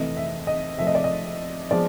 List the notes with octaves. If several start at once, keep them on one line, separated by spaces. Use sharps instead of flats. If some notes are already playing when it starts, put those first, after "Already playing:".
Already playing: F2 C3 E3 A3 D#5
E5
D#5
C3 F3 A3 E5
D#5
D5
D#5
F3 G#3 B3 D5